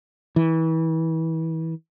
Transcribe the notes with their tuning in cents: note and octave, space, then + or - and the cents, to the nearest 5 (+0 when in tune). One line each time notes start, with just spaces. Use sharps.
E3 -30